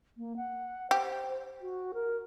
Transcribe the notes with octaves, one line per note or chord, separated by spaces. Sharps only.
A#3
F#5
G4 C5
F#4
A#4